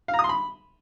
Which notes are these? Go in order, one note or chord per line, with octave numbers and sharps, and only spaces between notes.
F5
A#5
D#6
C6
B5